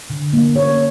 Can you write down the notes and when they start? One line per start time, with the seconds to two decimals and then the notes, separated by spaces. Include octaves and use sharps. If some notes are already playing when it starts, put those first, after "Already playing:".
0.10 D3
0.33 A#3
0.55 A#3 C#5